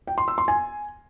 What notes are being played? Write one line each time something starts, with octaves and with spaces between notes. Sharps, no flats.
G5
C6
E6
C6
G#5